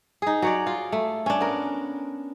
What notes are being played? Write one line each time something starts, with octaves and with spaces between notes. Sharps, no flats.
D#4 G#4
F#3 C#5 D5
F4
A3
C#4 D4
B3 A#4